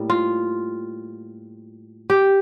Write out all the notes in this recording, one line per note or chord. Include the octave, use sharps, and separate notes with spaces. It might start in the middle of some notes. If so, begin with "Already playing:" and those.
Already playing: A2 G3 A#3
F4
G4